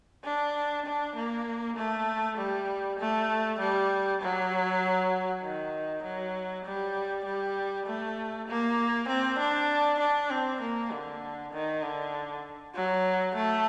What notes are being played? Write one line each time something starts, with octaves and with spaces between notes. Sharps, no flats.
D4
D4
A#3
A3
G3
A3
G3
F#3
D#3
F#3
G3
G3
A3
A#3
C4
D4
D4
C4
A#3
D3
D#3
D3
F#3
A3